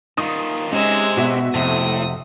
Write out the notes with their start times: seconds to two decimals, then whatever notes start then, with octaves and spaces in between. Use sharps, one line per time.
0.18 D#3 D#4 F4 D#6
0.72 C3 G#3 C#4 D#4 D#5 E6
1.17 B2 D#4 F#4 E5
1.54 F2 A2 C3 D#6